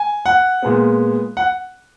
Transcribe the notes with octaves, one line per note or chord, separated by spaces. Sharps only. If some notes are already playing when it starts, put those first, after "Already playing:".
Already playing: G#5
F#5
A#2 G#3 B3
F#5